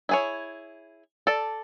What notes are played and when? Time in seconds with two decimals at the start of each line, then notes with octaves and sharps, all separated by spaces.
0.09 E4 G#4 C#5
1.27 A4 D5